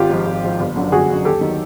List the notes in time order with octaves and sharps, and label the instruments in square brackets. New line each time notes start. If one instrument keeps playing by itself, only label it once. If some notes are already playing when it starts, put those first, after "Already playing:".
Already playing: [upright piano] G#1 F4 G4
G#2 F3
G#1
G#2 F3
G1
F#2 D3 F#3
G1 F#4 G#4
F#2 D3 F#3
D#2 G4 A4
D#3 F#3